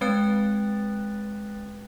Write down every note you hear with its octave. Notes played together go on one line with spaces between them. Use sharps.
G#3 C4 B4 G5 F#6 A6